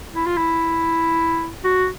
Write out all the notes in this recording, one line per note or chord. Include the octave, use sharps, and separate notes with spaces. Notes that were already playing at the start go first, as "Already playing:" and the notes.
E4
F4
E4
F#4